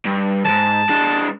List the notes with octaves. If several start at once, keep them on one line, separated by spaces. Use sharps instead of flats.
G2
F2 G#2 A5
G#3 D4